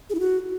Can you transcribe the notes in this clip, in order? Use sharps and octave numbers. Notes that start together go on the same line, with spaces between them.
G#4
E4
F#4